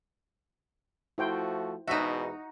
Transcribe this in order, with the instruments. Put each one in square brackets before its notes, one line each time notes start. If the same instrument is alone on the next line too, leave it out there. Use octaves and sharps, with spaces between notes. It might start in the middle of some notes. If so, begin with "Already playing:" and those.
[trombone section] F3 A3 F#4 [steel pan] E4 C5 G5
[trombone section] E2 G#2 B2 [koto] D#4 F#4 [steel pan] E5